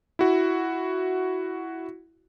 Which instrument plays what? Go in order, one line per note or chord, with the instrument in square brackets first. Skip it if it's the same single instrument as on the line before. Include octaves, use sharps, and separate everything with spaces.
[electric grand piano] E4 F#4